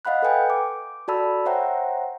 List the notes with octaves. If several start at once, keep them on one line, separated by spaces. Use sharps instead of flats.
D#5 F5 F#5 B5 F#6
A4 B4 G5 G#5 G6
D6
F#4 A4 D5 A5 B5 E6
C5 C#5 E5 F#5 G5 A#5